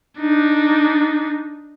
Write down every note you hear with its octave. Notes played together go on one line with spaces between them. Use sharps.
D4 D#4